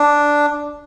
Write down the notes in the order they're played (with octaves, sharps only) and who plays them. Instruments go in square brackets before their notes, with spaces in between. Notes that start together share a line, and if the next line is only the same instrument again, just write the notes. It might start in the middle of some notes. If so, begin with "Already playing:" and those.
Already playing: [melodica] D4